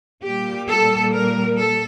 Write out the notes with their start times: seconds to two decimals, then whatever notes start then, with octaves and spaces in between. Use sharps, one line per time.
0.23 A#2 G3 G4
0.68 A4
1.12 A#4
1.57 A4